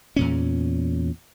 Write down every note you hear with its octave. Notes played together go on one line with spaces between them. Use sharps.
E2 A#2 C#4